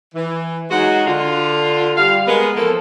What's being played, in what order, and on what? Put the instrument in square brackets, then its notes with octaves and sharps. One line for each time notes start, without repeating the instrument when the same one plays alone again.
[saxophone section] E3
F#3 G#3 D#4 F#4 G#4 F#5
D3 F4
G3 F5
G#3 B3 A#4
E3 F3 A#3 B3 A4